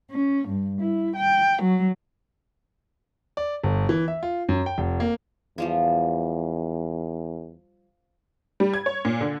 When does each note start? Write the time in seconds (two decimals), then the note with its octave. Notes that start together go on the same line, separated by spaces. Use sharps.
0.11 C#4
0.47 G2
0.80 E4
1.16 G5
1.62 F#3
3.37 D5
3.63 G1
3.89 E3
4.08 E5
4.23 F4
4.49 F#2
4.66 G5
4.78 F1
5.00 A#3
5.58 E2 F3 G3 F4
8.60 G3
8.74 G#6
8.86 C#5
9.05 A#2
9.21 D3